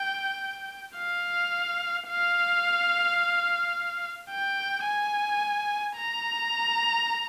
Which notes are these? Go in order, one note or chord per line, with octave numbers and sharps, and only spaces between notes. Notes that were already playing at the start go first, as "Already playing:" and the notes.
Already playing: G5
F5
F5
G5
G#5
A#5